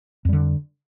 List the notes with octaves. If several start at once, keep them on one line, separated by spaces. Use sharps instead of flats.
F2 D3 G3